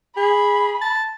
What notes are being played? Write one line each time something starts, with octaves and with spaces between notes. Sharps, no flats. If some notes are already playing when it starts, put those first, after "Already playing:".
G#4 B5
A5